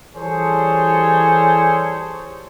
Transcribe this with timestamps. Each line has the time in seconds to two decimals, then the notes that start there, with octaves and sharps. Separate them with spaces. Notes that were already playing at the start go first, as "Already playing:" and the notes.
0.16 E3 G3 G#4 A4 C5 C#5